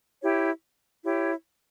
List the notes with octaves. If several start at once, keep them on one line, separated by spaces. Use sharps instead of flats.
E4 G4 C#5
E4 G4 C#5